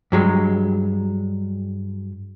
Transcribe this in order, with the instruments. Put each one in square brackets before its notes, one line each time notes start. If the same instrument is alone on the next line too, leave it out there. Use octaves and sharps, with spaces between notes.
[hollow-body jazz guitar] G2 F#3 G#3